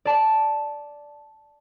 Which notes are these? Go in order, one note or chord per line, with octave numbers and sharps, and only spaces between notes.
D5 A5